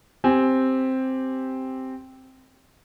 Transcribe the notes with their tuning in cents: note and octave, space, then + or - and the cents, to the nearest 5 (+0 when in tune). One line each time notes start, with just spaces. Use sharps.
C4 +0 G4 +0 G#5 +0